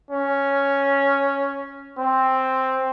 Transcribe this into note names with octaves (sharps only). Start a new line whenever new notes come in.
C#4
C4